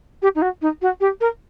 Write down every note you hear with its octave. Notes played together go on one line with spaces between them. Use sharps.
G4
D#4
F#4
D#4
F#4
G4
A#4